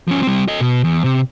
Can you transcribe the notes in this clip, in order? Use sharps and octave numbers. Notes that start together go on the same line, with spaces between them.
F3 C#4
G3 C4
A4 D#5
B2
E2
C3